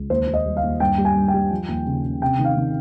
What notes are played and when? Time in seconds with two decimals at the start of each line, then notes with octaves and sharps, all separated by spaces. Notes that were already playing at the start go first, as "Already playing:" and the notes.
Already playing: C#2
0.10 D#2 C5
0.27 D#2
0.34 D#5
0.46 G3
0.57 F5
0.63 D#2
0.80 G2 G5
0.98 G3
1.05 G#5
1.16 G2
1.28 G5
1.34 G3
1.51 F3
1.68 D#2
1.86 C#3
2.04 C#3
2.22 C3 G5
2.39 D#3
2.45 F5
2.57 D#3